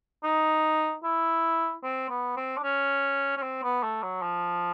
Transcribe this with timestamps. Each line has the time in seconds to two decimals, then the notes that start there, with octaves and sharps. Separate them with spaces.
0.23 D#4
1.04 E4
1.83 C4
2.10 B3
2.37 C4
2.58 D4
2.63 C#4
3.37 C#4
3.43 C4
3.63 B3
3.83 A3
4.03 F#3
4.22 F3